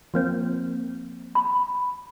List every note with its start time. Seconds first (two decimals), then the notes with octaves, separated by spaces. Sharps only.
0.14 F3 A#3 C4
1.35 B5